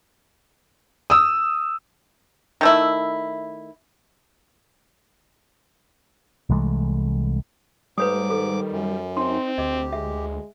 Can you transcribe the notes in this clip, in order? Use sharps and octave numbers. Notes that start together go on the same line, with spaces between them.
D#6 E6
D#3 A3 E4
C2 E3 G#3 A3
G#2 G3 A3 B4 C#5 D6 D#6
D#3 A4
F#2
C4 D#4 C6
D2 G4 D#5
G#3 E5